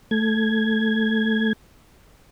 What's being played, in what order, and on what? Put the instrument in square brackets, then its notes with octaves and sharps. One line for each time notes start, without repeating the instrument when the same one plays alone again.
[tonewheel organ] A3 G#6